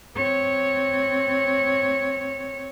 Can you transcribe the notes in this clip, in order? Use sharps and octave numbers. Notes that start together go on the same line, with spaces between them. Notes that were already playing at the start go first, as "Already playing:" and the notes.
C4 C#5